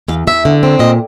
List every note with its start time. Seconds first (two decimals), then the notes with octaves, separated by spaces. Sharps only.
0.08 E2 F5
0.27 E2 E5
0.45 D3
0.63 C4
0.79 A#2 D#5